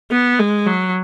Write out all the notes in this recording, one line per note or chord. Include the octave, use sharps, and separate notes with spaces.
B3
G#3
F#3